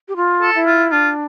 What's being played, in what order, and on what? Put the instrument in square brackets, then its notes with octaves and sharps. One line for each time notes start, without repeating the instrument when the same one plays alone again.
[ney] G4
F4
[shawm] A4
[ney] E4
[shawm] F4
[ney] D4 [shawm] F4